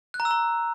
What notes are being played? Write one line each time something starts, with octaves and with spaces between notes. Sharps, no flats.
F#6
A#5
E6
A#5